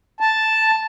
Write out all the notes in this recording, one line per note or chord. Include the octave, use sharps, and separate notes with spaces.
A5